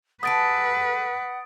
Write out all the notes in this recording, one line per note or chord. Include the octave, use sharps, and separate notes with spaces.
G3 G#4 A4 B4 F#5 D#6 A6 D7